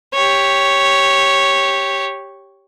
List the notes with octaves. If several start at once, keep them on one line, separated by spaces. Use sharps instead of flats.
G4 C#5